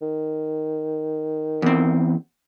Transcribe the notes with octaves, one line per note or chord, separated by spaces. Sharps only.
D#3
E2 C4